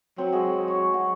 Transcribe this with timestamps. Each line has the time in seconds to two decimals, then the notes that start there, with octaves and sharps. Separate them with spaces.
0.18 F#3 C4
0.32 G#3 F#4 G#4
0.68 C#5
0.94 F#5